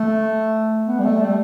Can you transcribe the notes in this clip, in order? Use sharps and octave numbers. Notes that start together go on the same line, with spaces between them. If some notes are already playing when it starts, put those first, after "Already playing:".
Already playing: A3
B3
G3
A3
G3